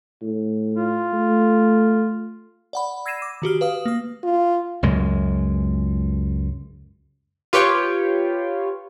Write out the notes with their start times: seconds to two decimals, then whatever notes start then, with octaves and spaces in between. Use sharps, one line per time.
0.22 A2
0.74 F4
1.13 A3
2.73 D5 F#5 B5
3.06 E6 G#6 A#6 C7 D#7 E7
3.22 D6
3.42 D#3 F#4 G4 F6
3.61 B4 F5 D#6
3.86 A#3 D#6
4.23 F4
4.83 C#2 F#2 G#3
7.53 F4 G4 B4 C#5 G5